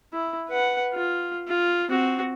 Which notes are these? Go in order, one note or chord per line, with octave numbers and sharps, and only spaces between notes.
E4
B4 F#5
F4
F4
C4 F#4